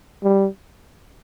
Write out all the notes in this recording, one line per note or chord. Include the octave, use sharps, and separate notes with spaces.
G3